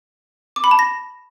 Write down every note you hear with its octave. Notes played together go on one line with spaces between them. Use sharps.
D6
B5
A5
A#6